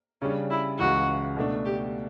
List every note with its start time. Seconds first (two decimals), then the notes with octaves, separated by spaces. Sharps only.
0.22 C#3 G3 C#4 D4
0.50 E4
0.79 C#2 C#3 E3 F#4
1.36 B2 A3 D4
1.65 G4